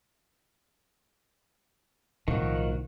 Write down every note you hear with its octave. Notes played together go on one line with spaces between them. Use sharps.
B1 A2 D#3 F3 F#4